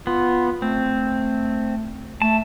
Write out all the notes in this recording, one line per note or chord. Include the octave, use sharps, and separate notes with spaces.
B3 F4
A3 C4
A3 A5